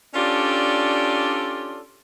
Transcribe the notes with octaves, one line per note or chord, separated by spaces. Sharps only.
C#4 D4 F4 G4 A4 D5